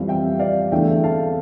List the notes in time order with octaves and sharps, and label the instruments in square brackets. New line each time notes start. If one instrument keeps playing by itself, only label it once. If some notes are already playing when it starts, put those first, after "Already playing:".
Already playing: [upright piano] F2 E3 G3 F5
E5 G5
D5 F5
E2 D3 A3 E5 G5
F5 A5